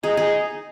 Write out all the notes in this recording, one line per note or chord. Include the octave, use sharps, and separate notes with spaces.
D#4 G#4
D#4 G#4